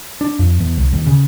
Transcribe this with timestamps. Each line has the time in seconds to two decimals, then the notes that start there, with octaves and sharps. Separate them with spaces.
0.21 D4
0.39 F2
0.60 E2
0.77 C2
0.93 D#2
1.06 C#3